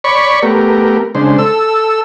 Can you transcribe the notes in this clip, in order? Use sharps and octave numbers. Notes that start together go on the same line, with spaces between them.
C#5 D5 B5 C#6
A3 B3 G4 A#4
C#3 G#3 D4 C5
A4 E6